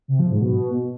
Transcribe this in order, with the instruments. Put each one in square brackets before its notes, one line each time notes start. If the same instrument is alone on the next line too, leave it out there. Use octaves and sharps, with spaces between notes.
[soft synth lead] C3
F3
G#2
B2